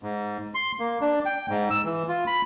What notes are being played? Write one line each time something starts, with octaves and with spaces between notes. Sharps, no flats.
G#2
C6
A#3
D4
G5
G#2
E6
E3
F4
B5